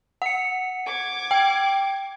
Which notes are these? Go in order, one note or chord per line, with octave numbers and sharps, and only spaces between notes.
F#5 C#7
D6 G#6
G5